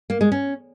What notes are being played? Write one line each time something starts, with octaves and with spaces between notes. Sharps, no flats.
A#3
G#3
C#4